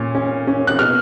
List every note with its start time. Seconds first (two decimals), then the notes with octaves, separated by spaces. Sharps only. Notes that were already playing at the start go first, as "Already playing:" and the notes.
Already playing: A#2 C#4
0.15 C#4
0.47 C#4
0.67 F#6
0.79 B2 F6